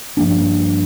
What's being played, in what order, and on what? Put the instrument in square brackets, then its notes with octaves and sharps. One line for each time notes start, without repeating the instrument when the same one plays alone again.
[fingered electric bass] G2 F3 A#3 D4